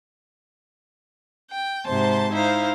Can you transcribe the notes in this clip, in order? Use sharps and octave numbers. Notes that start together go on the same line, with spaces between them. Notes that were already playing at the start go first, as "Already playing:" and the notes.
G5
G#2 C3 C5 A5 C6
D#4 E4 C5 F5